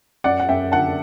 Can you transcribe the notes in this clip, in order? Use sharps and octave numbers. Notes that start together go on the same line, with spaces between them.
F#2 D5 F#5
F#5
F#2 E5 G5
D3 F#5 A5